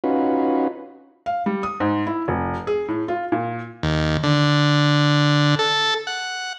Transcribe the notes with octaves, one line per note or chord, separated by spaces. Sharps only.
C#4 D#4 F4 F#4 B4
F5
G3
D#6
G#2
E4
F1
G#4
A2
F4
A#2
D#2
D3
A4
F#5